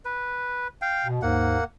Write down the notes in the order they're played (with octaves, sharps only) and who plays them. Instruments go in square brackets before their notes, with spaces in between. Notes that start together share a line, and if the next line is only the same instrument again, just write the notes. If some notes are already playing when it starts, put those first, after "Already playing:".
[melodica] B4
F5 G5
[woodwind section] B2
[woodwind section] D#2 G#2 [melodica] A#3 F#5